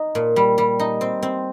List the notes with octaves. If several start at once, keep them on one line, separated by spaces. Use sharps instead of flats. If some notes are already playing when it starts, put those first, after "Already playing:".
Already playing: D#4
A#2
G3
G3
D#4
C4
C4